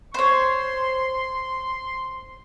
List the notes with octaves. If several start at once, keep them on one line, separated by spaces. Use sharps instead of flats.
C5 C#5 C6